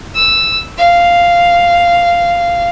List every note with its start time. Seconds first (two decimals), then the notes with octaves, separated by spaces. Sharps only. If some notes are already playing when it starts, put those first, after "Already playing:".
0.15 E6
0.78 F5